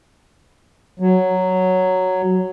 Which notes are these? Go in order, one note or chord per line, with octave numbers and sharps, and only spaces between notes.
F#3